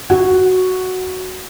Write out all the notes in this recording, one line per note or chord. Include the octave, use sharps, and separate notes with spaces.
F#4